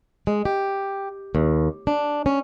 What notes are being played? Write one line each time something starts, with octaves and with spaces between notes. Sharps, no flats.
G#3
G4
D#2
D4
C#4